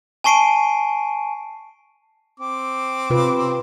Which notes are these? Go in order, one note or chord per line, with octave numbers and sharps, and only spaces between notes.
G#5 A5 C#6 C7 D7 D#7
C4 D6
C3 F4 B4